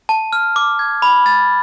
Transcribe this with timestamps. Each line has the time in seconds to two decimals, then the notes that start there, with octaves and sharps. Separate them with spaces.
0.09 A5
0.33 F6
0.56 D6
0.79 G#6
1.02 B5
1.26 A6